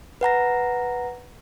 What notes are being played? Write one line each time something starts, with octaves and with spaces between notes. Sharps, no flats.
B4 F#5 A#5 A#6